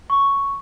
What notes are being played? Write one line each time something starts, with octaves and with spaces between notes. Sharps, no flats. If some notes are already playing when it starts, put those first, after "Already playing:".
C#6